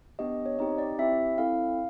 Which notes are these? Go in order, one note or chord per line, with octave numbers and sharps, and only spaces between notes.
B3 D4 G4 D#5
C#5
C4 D#4 G4 D#5
D5
C4 E4 G4 E5
C4 E4 A4 F5